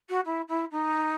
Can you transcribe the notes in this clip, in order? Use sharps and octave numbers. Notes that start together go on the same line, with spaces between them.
F#4
E4
E4
D#4